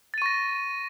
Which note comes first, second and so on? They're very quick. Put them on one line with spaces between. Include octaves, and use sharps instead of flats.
A6 D#7 C#6 A#6